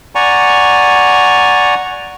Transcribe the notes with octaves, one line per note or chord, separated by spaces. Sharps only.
D5 F#5 G#5 A#5 C#6